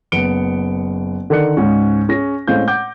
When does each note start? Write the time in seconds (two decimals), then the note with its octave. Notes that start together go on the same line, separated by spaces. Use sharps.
0.12 F#1 B3 C#7 D7 G7
1.30 D3 D#3 A#4 D5 F#6 C#7
1.57 C#2 G#2 C#4
2.09 C#4 G#4 A#6
2.48 A2 G#3 C4 C#4 F5 G6
2.68 F#5 D6 G6